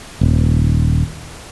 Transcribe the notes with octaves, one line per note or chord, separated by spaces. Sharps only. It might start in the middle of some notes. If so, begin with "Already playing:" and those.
D#1